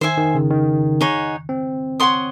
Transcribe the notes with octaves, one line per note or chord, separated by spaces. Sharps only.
D#3 C5 E5 G#5
D#3
C#3
D#3
D#4 G#4 C#5 F#5
C4
C#5 F#5 C6 D#6